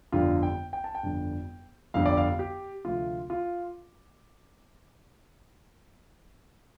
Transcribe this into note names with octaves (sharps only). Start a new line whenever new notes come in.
G1 F2 D3 G3 F4
G5
G5
A5
G5
G1 F2 D3 G3
G1 F2 D3 G3 F5
D5
F5
G4
D2 C3 F3 A3 F4
F4